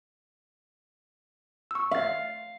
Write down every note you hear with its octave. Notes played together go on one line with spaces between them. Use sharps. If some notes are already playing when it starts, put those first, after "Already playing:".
C#6 E6
E5 F5 A6